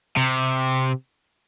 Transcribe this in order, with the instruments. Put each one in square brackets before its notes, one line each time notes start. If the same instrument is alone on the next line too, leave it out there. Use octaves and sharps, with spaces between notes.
[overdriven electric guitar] C3